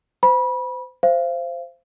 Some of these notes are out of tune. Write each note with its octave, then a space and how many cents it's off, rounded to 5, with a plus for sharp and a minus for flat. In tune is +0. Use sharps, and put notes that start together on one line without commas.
C5 -30 B5 -25
C5 +0 F5 -30